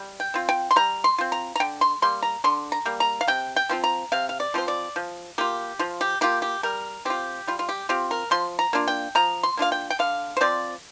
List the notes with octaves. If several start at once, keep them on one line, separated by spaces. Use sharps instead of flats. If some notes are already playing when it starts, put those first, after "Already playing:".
Already playing: G3
G5
C4 F4
G5
C6
G3 A#5
C6
C4 F4
A#5
A#5
D3 G5
C6
G3 A#3 C6
A#5
D3 C6
A#5
G3 A#3
A#5
F5
C3 G5
G5
F3 C4 F4
A#5
C3 F5
F5
D5
F3 C4 F4 C5
D5
F3
A#3 F4 G4
F3 F4
G4
A#3 F4 G4
G4
G3 A#4
C4 F4 G4
G3 F4
F4
G4
C4 F4 G4
A#4
F3 C6
A#5
A#3 D4 F4
G5
F3 A#5
C6
A#3 D4 F4 F5
G5
G5
D3 F5
C5
F3 C4 F4 D5